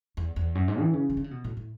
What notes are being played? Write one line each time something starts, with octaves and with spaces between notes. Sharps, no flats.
E2
E2
F#2
G#2
E3
C#3
E3
D3
C#3
B2
A2
A2